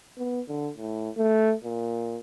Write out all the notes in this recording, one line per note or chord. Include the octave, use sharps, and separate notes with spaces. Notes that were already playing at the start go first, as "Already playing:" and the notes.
B3
D3
A2
A3
A#2